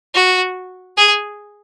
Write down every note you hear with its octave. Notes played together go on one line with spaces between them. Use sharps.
F#4
G#4